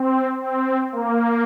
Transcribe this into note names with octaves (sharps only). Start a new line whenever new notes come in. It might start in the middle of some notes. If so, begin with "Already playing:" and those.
Already playing: C4
C4
A#3